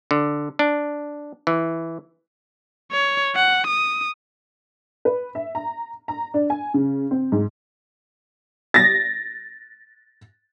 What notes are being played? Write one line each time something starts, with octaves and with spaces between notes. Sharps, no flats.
D3
D4
E3
C#5
F#5
D#6
B4
E5
A#5
A#5
D4
G#5
C#3
C4
G#2
A6 A#6